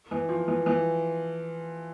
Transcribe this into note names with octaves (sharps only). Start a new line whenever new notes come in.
E3
F3
E3
E3